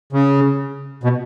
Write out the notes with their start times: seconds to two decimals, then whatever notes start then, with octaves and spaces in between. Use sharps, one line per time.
0.13 C#3
1.03 B2